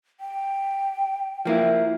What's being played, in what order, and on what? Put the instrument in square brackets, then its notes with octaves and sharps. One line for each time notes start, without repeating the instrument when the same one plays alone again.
[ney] G5
[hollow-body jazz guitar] F3 A#3 E4